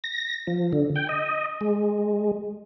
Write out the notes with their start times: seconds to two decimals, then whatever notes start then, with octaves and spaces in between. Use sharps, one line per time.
0.04 A#6
0.47 F3
0.73 D3
0.96 G5
1.09 D#5
1.61 G#3